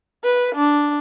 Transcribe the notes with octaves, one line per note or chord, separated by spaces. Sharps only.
B4
D4